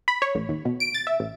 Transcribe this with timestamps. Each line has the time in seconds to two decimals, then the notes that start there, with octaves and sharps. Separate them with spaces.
0.08 B5
0.22 C#5
0.35 A1
0.49 D#2
0.65 B2
0.80 D7
0.94 A6
1.07 E5
1.20 A1